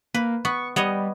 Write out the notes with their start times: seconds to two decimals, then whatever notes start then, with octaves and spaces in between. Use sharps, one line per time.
0.14 A#3 B4
0.45 B3 C#6
0.76 G3 B3 C#5 D#5